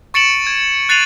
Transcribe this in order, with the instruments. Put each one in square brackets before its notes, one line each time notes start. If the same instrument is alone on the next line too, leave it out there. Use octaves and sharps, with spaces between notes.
[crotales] C#6 A6 C#7 D7 E7 F#7
G#6
F#6 A6 C7 D#7 F7 F#7